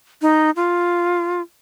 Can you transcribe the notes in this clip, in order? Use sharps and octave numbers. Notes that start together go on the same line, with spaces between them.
D#4
F4